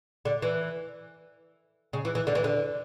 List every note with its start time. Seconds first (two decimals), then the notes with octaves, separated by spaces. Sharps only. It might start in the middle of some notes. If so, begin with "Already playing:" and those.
0.25 D3
0.42 E3
1.93 C#3
2.05 E3
2.15 E3
2.27 D3
2.35 E3
2.44 D3